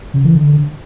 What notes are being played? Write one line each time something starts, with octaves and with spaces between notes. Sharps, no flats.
C#3
E3
D3